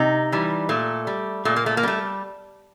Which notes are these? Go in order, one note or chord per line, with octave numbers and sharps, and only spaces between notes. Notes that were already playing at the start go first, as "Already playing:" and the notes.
Already playing: C3 D#4
E3 G3
A#2 A3
G3
A#2 A3
A#3
A3
A#3
G3 A3